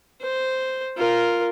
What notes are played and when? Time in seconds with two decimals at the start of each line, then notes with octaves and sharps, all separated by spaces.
0.21 C5
0.98 F4 A#4